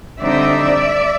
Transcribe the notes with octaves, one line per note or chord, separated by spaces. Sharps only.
D3 G3 C4 D#4 D5 E5